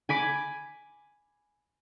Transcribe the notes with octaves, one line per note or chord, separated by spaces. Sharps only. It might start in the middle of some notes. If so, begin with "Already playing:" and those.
G#5 B5 D6